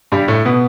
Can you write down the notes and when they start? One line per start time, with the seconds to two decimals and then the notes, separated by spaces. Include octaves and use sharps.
0.12 G2 G3
0.28 A2 A3
0.45 B2 B3